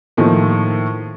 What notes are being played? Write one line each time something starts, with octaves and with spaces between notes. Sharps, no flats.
A2 D#3 F3 A3 A#3